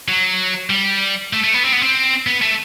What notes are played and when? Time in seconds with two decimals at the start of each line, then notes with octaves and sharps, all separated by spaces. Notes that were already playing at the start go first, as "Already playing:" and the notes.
0.09 F#3
0.70 G3
1.33 A3
1.44 A3
1.54 B3
1.63 C4
1.72 B3
1.82 C4
2.27 B3
2.42 A3